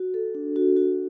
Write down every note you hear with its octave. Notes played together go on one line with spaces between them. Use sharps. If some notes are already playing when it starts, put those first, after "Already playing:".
Already playing: F#4
A4
D4
F#4
F#4